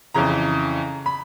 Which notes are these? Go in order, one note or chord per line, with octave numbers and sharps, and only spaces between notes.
F2 C#3 E3 A#5
B5